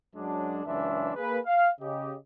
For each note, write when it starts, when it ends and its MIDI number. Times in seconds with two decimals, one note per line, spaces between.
0.16 0.65 42
0.16 0.65 54
0.16 0.65 56
0.16 0.65 62
0.66 1.11 37
0.66 1.11 42
0.66 1.11 52
0.66 1.11 56
0.66 1.11 62
0.66 1.11 76
1.15 1.39 58
1.15 1.39 68
1.15 1.39 71
1.45 1.71 77
1.81 2.16 49
1.81 2.16 67
1.81 2.16 75